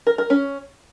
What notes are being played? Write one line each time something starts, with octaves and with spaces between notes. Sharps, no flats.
A#4
A#4
C#4